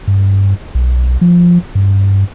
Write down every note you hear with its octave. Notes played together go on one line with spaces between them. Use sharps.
G2
B1
F3
G2